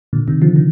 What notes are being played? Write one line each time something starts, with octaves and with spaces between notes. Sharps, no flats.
A#2 D3
C3 D#3
D3 F3
D#3